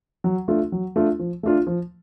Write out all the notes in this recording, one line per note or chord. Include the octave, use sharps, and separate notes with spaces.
F#3
A3 D4 F4
F#3
A3 D4 F4
F3
A3 D4 F4
F3